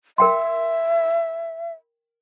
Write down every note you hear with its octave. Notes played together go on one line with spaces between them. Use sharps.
A#4 E5 G5 C6